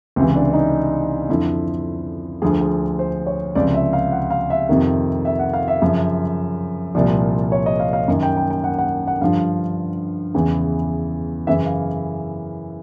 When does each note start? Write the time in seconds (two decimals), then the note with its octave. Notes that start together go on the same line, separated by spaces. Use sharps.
0.16 C#2 C3 E3 C4
0.35 D4
0.53 D#4
1.29 F2 D3 F3 E4
2.42 D2 D3 F3 G#4
2.61 G#4
2.99 C5
3.27 C#5
3.55 C#2 C3 F3 D5
3.74 E5
3.93 F5
4.12 F#5
4.31 F5
4.50 E5
4.69 F2 C3 D#3
5.25 E5
5.39 F#5
5.53 F5
5.68 E5
5.81 F#2 C#3 F3
6.95 C2 A#2 F3 D5
7.52 C#5
7.66 D#5
7.80 F5
7.93 F5
8.08 F#2 D#3
8.23 G5
8.37 G5
8.50 G5
8.64 F#5
8.78 F#5
9.07 F#5
9.21 G2 D3 F3 F5
10.34 E2 C#3 E3
11.47 F#2 C#3 E3 E5
11.66 F5